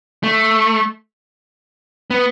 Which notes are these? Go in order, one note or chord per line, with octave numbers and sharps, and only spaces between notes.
A3
B3